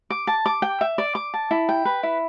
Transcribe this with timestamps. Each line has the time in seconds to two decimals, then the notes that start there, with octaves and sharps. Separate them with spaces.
0.10 D6
0.27 A5
0.46 D6
0.62 G5
0.81 E5
0.98 D5
1.15 D6
1.34 A5
1.51 E4
1.69 G5
1.85 B4
2.03 E4